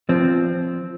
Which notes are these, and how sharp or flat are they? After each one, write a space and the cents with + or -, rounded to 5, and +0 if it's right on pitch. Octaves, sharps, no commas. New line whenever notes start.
F3 -10 C4 +0